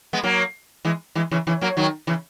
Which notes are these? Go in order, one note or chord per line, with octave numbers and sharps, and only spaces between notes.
G#3 B3
F#3 A#3
E3 G#3
E3 G#3
C#3 E3
C#3 E3
F#3 A#3
D#3 F#3
C#3 E3